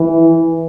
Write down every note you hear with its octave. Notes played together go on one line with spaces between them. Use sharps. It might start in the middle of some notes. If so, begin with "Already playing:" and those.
Already playing: E3